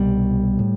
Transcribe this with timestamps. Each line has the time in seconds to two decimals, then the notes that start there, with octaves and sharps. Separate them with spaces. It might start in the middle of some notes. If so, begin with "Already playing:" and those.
Already playing: C2 B2 G3
0.59 A2